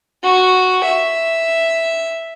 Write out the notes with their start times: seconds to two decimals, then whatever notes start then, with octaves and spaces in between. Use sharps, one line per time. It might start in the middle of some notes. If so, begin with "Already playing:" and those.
0.23 F#4
0.84 E5